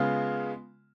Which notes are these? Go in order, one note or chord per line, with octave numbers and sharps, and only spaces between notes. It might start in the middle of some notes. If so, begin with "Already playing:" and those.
Already playing: C#3 G#3 B3 F4